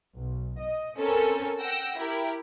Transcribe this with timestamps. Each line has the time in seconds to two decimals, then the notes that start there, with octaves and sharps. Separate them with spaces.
0.16 B1
0.59 D#5
0.97 C4 C#4 A4 A#4
1.60 F#5 G5 E6 A#6
1.98 E4 G4 A#4